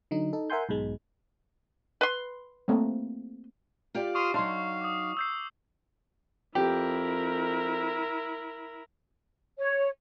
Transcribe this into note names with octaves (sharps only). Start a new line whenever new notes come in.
D3 F#3 D#4
D#4 A4
A#4 E5 F#5 G#5 C6 G6
B1 G#2 B2 G#3
B4 C6
A3 A#3 C4
F4 G4 D5
C6 C#6 D#6 F6 C7
F#3 D4 D#4 F5 C6
D6 D#6
E6 G6 C7
F2 E4 G4 A#4
C#5